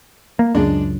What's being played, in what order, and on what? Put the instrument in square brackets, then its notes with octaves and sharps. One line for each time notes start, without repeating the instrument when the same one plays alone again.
[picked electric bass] A#3
[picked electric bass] C#2 F#2 [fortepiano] G#3 D4